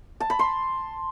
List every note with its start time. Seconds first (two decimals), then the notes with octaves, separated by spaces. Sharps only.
0.20 A5
0.30 B5
0.39 C6